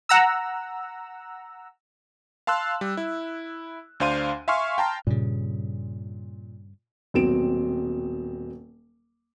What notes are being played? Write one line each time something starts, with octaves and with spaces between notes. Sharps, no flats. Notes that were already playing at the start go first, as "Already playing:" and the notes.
F#5 A#5 E6
F5 A5 C6 E6 F#6
G3
E4
D2 D4 C5 F5 C6 D#7
E5 F5 G#5 C6 C#6 F6
G5 A5 A#5 C6
G2 A#2 C#3
D#1 B2 F#3 C4 D7 E7